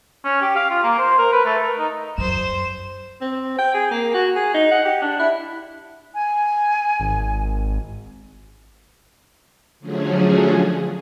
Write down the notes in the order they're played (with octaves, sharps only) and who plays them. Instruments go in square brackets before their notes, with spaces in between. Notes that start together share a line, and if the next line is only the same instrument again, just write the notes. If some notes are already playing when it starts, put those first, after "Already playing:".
[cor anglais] C#4
G4
F5
F4
A#3
C5
A#4
B4
A3
A#4
D#4
[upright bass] F#2 [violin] C5 E7
[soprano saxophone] C4
G5
G#4
A#3
F#4
G#4
D#4
F#5
G4
D4
E4
[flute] G#5
[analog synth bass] G#1
[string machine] D3 F3 F#3 A3 C#4 G#4